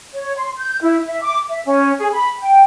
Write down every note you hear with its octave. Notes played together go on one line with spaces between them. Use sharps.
C#5
C6
G6
E4
E5
D6
E5
C#4
G#4
B5
G5